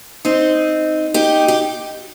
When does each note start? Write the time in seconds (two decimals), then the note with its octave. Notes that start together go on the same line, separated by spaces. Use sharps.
0.25 C4 D#4
1.14 D#4 G4
1.48 G4